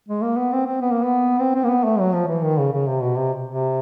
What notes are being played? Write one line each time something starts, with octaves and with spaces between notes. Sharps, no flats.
G#3
A#3
B3
C4
C4
B3
A#3
B3
C4
C4
A#3
B3
A3
F#3
F3
E3
D#3
C#3
C#3
C3
B2
C3
C3